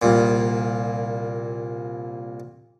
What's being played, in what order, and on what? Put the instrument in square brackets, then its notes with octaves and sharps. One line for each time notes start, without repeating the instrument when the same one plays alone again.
[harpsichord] C2 A#2